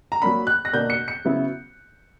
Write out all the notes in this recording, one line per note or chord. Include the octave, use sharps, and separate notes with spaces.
A#5
F#3 A#3 D4 B5
F#6
A#6
B2 A#3 D4 G6
C#7
C#7
C#3 F#3 B3 E4